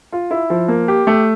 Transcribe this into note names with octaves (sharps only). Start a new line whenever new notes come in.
F4
E4
F3
A#3
G4
A3